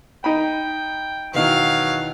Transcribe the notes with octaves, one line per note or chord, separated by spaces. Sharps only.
D#4 G5 B5
E2 B2 D#3 F#3 F5